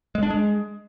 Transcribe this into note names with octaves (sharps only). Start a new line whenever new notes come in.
G#3
D4
G#3